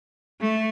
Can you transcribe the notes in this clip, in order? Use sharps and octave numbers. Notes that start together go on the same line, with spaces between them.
A3